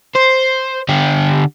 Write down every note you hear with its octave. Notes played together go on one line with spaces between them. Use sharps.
C5
D3 G4